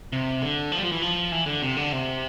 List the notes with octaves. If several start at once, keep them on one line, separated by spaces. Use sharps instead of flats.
C3
D3
F3
G3
F3
E3
F3
E3
D3
C3
D3
C3